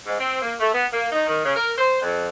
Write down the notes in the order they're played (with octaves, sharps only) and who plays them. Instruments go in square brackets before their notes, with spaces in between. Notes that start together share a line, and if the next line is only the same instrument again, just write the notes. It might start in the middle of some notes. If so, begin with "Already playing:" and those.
[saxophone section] G#2
C4
A#3
A3
B3
A#3
D#4
D#3
C#3
A#4
C5
F2